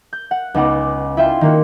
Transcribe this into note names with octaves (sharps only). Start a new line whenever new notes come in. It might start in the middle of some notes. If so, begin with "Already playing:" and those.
G6
F#5
C#2 B3 D#4 F#5 D6
E4 F4 E5 G5 C6
D#3 A#3 F#4